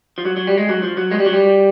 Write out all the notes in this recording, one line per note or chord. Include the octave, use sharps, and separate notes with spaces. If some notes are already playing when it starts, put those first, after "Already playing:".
F3
F#3
F#3
G3
G#3
F#3
F3
F#3
G#3
G3
F#3
G3